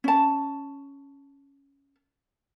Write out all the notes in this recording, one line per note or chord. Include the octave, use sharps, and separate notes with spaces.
C#4 A5